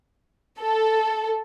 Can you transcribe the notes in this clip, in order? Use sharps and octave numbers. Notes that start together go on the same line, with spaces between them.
A4